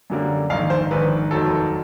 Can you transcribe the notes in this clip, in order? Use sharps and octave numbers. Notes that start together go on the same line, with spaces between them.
F#2 D3 G3 A#3
A#1 G#2 D#3 F5
C5
A#1 G#2 D#3 B4
F1 D#2 D#3 F#3 A4